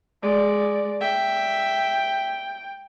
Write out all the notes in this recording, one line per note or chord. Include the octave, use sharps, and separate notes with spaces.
G#3 D5
E5 G5